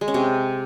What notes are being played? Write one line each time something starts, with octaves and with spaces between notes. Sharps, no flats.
G#3
C#4
C3